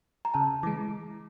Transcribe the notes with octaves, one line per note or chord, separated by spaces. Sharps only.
A#5
C#3 A5
E3 G#3 D6